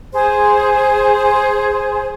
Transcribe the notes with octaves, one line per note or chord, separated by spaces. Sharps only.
G#4 C5